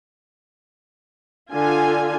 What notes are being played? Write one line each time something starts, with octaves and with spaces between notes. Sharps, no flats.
D3 F4 G#5